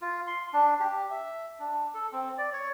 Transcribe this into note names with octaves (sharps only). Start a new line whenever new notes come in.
F4
C6
D4
G4
E5
D4
A4
C4
D5
C#5